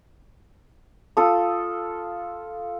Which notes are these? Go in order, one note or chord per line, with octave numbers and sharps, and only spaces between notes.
F4 A4 D#6